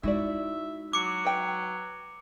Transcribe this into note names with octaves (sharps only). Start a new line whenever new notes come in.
G#3 D#4 E4 F#4 D5 E5
F#3 D6 C#7
B4 G5